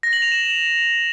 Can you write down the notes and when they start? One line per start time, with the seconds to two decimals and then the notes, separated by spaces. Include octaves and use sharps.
0.03 A#6
0.13 F#7
0.22 F7
0.32 E7